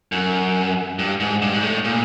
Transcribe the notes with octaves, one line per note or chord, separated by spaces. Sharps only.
F#2
G2
G#2
G2
G#2
A2
A#2